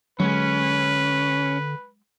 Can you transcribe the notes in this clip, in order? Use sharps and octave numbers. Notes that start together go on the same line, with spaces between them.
D3 F#3 G#3 C#4 B4